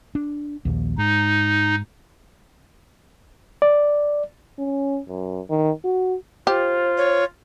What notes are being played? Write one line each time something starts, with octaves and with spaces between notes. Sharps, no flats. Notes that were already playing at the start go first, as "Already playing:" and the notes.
D4
A#1 D#2
G#2 D#4
D5
C#4
F#2
D#3
F#4
F4 G4 C5
C#5